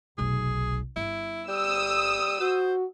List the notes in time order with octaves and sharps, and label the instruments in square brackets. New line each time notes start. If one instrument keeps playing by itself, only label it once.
[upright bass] F1 B1 [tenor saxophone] G#4
[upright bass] G1 [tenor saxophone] E4
[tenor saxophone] G3 [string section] D#6 E6
[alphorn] F#4 [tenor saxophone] C5